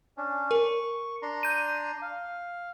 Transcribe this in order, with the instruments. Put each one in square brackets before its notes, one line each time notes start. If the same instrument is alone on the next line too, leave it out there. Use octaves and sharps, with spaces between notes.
[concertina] C#4 D4
[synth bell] A#4 [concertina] C#6
[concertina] D4 A#5 C6
[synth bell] G6 D#7
[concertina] F5